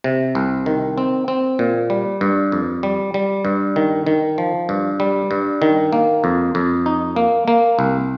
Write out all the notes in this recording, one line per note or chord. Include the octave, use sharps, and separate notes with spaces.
C3
C2
D#3
C4
C4
A#2
G3
G2
F2
G3
G3
G2
D#3
D#3
F3
G2
G3
G2
D#3
A#3
F2
F2
D#4
A#3
A#3
C2